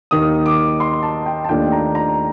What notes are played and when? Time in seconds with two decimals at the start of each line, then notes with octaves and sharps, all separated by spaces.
0.11 D#2 D#3 A#3 D#4 D#6
0.46 D6
0.80 C6
1.03 A5
1.26 G5
1.44 A5
1.49 D#2 D#3 A3 D4 F4 G5
1.72 A#5
1.95 A#5